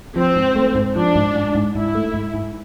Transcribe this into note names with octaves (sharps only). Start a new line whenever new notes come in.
F3 C4
G#2
A3
G#2
F3 D4
G#2
G#2
G#2
G#2 E4
A3
G#2
G#2